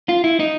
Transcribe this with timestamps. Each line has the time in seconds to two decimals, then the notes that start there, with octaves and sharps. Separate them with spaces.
0.09 F4
0.24 E4
0.40 D#4